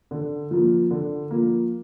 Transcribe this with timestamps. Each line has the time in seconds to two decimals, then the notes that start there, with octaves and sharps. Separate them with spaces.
0.11 D3
0.51 F3 A#3
0.91 D3
1.31 F3 A#3